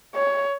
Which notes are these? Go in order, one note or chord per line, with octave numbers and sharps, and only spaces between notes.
C#5